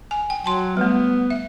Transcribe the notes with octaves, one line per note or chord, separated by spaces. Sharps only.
G#5
G5
F#3 G5 A5 C6
G3 A3 B3
E5